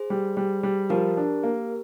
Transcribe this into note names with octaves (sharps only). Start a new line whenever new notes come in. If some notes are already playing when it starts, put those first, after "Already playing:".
Already playing: G#4 C5
G3
G3
G3
F3 G4 A#4
D4
A#3